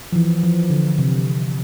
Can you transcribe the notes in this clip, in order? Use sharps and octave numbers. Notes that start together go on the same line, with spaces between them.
F3
E3
F3
D3
C3